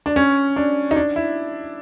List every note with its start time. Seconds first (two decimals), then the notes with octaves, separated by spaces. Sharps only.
0.06 D4
0.16 C#4
0.56 D4
0.91 D#4
0.96 D4
1.16 E4